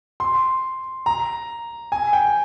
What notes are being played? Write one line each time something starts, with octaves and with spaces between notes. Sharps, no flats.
C6
A#5
G#5
G5